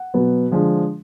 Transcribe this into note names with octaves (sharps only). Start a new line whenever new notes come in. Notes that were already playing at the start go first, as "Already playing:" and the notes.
Already playing: F#5
B2 F#3 B3
D3 F3 G#3